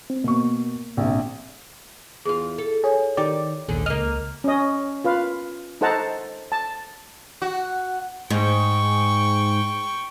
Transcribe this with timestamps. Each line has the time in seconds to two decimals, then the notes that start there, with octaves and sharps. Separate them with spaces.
0.10 C4
0.24 B2 A#3 C#6
0.97 A#1 C3
2.25 E2 F4 G#4
2.58 A4
2.84 G#4 C#5
3.17 D#3 D#4 G4 D5
3.68 A#1 D#2 G#2 D3 G#4
3.86 C#2 A#3 D#5 F6
4.44 C#4 D#5
5.04 F4 B4 F5
5.81 D#4 A4 C5 F#5 A5 A#5
6.52 A5
7.42 F#4
8.30 G#2 G5 C#6